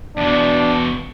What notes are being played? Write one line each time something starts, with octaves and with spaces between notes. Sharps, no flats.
E2 B2 D4